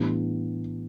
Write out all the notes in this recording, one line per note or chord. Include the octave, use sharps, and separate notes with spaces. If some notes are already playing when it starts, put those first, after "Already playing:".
Already playing: A2 E3 G3 B3 D4